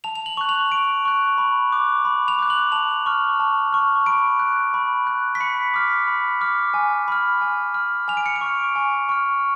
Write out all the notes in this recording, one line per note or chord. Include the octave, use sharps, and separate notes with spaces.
A5 F7
F7
F#7
C#6 F#6
F7
A5 D7
C#6 F#6
B5
D6 F#6
B5
F7
D6 F#6
F#7
A5 F7
C#6 F6
A5
C#6 F6
B5 D7
F#6
B5
F#6
B6
B5 C#7
D6 F6
B5
D6 F6
G#5
B5 F6
G#5
B5 F6
G#5 F7
D7
C#7
D7
C#6 F6
G#5
C#6 F6